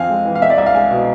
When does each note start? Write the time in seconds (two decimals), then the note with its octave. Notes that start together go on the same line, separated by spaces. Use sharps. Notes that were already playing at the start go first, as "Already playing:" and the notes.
Already playing: F2 C4 F5 G#5
0.10 G#3
0.25 E3
0.35 F5
0.42 C4 E5
0.50 D5
0.58 C2 E5
0.66 F5
0.74 G#3 G#5
0.91 B2